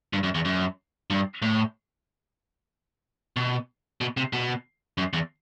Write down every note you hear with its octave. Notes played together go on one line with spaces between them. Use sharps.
G2
F#2
E2
F#2
G2
A2
B2
B2
C3
B2
F#2
E2